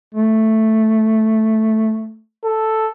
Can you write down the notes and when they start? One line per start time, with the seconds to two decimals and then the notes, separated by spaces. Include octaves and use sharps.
0.15 A3
2.45 A4